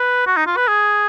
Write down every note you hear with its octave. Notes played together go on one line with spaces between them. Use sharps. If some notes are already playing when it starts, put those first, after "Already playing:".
Already playing: B4
F#4
D#4
F4
B4
G#4